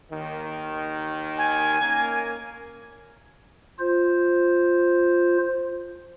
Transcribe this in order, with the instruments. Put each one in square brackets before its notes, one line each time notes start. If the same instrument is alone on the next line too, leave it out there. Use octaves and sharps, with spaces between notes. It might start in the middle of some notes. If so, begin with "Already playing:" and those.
[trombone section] D#2 D#3
[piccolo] G#5
[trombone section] A#3 C#4 A#4
[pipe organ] F4 C5